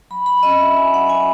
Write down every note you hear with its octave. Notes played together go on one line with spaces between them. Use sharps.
F#3 B5
B5
C#4 F#4 D#5
E5
F#3 G#5
F#5
C#4 F#4 G#5